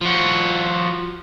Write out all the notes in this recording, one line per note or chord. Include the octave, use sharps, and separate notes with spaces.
F3 F#4